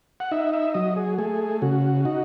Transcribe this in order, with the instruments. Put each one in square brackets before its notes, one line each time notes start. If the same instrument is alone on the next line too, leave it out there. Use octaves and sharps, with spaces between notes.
[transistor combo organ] F#5
D#4 E5
E5
F#3 D#5
G#4
A3 G#4
C#3 F#4
D#4 F#4